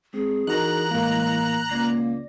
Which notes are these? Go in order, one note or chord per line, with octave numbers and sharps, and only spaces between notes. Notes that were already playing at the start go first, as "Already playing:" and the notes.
G#3 C4 G#4
E3 D#4 F#4 A#4 A#5 F#6
A2 G#3 A#3
C#2 A#3 D5 A#6